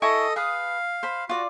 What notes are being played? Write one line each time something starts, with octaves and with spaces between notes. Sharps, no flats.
E4 A4 D#5 G#5 C#6 D#6
G#4 B4 F5 D#6
C5 B5
F4 F#4 D5